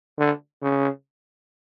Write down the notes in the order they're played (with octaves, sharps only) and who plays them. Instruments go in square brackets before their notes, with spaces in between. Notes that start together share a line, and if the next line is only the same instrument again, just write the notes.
[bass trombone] D3
C#3